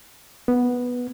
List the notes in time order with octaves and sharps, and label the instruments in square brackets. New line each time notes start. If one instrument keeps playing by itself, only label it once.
[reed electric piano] B3